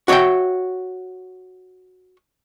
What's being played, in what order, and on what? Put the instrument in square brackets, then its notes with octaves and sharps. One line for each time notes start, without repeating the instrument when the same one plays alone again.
[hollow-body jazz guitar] F#4 C#5 D5 E5 G5